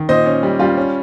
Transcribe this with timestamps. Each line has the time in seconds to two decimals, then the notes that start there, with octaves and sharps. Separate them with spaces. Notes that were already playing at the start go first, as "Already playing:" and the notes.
Already playing: D#3
0.09 A#2 C5 D#5
0.26 C#4
0.43 G3
0.59 G3 F4
0.77 C#4